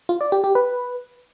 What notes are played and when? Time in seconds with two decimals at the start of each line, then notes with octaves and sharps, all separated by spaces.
0.09 F4
0.21 D5
0.32 G4
0.44 G4
0.55 B4